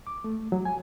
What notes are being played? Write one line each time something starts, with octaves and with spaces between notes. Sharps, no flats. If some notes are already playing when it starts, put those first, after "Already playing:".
D6
A3
F#3
G#5